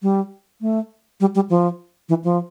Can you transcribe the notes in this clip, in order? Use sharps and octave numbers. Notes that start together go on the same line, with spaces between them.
G3
A3
G3
G3
F3
E3
F3